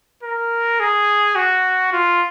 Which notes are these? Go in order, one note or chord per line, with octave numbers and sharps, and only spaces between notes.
A#4
G#4
F#4
F4